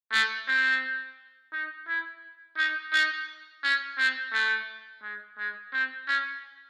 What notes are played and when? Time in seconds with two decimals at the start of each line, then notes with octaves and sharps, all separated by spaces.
0.12 A3
0.48 C4
1.53 D#4
1.88 E4
2.57 D#4
2.92 D#4
3.63 C#4
3.98 C4
4.33 A3
5.03 G#3
5.38 G#3
5.73 C4
6.07 C#4